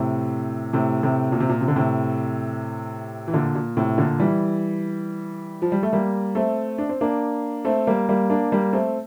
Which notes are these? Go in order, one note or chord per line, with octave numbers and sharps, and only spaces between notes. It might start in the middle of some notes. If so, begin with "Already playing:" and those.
Already playing: A2 C3
A2 C3
A2 C3
A#2
C3
A#2
C3
D3
A2 C3
E3
A#2 D3
A#2
A2 C3
A#2 D3
E3 G3
F3
G3
A3
G3 A#3
A3 C4
D4
C4
A#3 D4
A3 C4
G3 A#3
G3 A#3
A#3 D4
G3 A#3
A3 C4